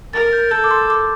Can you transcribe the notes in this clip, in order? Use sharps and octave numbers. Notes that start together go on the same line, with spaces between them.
A#4 A6
G6
A4 G6
D6
C6
D6